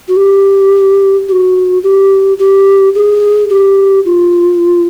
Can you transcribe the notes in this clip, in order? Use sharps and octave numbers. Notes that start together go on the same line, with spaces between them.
F#4
G4
G4
F#4
G4
G4
G#4
G4
F4